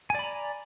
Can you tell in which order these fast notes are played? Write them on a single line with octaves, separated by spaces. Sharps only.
G#5 D5 B5 A#5